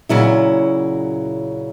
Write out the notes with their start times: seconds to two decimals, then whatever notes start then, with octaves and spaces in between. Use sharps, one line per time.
0.09 A#2 C#3 F#3 E4